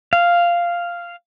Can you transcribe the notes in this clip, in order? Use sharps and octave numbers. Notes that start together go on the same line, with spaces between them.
F5